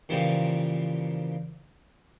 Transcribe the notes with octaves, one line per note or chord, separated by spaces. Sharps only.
A#2 C#3 E3 F3 G3 A#3